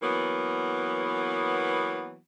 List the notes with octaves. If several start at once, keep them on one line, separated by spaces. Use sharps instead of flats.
E3 F#3 A#3 B3